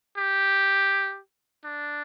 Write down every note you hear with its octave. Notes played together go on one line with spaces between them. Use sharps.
G4
D4